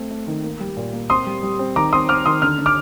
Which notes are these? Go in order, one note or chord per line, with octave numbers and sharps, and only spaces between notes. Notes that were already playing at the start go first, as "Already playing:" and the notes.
Already playing: A3 C4
A3
D#3
A#3
G3
A#2
A#3
C4 C6 D#6
G3
G3
C4
D#3 A#5 D6
C4 C6 D#6
C4 D6 F6
D#3 C6 D#6
D3 F6
D3
D6 F6